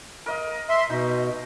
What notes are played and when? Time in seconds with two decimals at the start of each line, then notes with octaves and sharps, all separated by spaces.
0.26 A#4 D#5 F5
0.69 E5 C6
0.90 B2 D#4